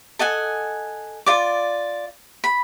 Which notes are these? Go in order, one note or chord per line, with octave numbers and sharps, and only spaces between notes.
A4 D#5 F#5 G#5
F4 D5 D6
B5